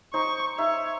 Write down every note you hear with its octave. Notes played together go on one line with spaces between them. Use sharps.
D#4 C5 C#6
D#4 C#5 E5